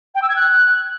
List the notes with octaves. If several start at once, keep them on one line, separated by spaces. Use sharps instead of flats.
G5
E6
G#6
F#6